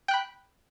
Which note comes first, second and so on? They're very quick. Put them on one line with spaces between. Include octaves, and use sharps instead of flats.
G5 F#6 B5